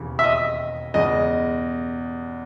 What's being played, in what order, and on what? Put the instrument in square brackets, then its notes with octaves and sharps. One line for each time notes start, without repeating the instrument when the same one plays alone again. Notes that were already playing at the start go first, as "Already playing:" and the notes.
Already playing: [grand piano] E1 D#2 C#3 E3
[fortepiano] E5
D#5
[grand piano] E2 C#3 G#3 [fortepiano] D#5